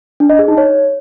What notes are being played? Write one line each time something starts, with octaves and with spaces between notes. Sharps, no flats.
D4
D#5
G#4
D#4
C#5